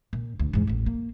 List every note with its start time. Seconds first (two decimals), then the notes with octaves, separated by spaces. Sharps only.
0.13 A#2
0.40 D2
0.53 E2 G#2
0.67 A1 A2
0.86 A#3